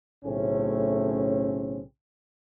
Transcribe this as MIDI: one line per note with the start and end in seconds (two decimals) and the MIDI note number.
0.25 1.82 35
0.25 1.82 45
0.25 1.82 49
0.25 1.82 57
0.25 1.82 60
0.25 1.82 61